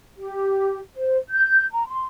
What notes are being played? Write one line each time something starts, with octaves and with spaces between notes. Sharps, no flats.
G4
C5
G6
A#5
C6